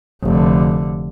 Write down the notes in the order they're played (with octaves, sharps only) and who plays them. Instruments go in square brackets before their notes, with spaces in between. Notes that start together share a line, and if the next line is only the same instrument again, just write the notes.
[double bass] F1 D3